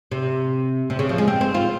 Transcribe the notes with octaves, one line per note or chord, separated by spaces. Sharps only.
C3
C3
C#3
F3
G#3
C4
C4
F4